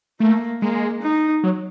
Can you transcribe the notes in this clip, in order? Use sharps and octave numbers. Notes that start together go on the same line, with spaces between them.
A3 A#3
G#3 A#3
D#4
F#3